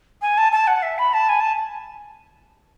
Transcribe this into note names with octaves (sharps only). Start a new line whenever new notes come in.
G#5
A5
A5
F#5
E5
B5
A5
G#5
A5